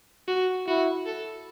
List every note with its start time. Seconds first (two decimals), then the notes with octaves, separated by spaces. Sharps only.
0.28 F#4
0.67 E4 F#4
1.06 A4